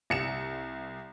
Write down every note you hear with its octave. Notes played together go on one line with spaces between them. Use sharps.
C2 C#7 E7